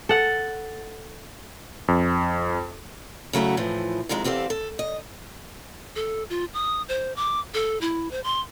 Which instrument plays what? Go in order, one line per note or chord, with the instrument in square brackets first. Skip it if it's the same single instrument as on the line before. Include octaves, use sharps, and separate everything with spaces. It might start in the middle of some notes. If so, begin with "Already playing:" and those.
[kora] A4 F#5
[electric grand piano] F2
[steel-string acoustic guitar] C#3 F#3 A3 E4 F#4
A2 E3 F3
F2 C3 D#3 G#3 D#4
E2 C4 G4 A4 F5
A4
D#5
[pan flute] A4
F4
D#6
C5
D6
A4
E4
C5
C6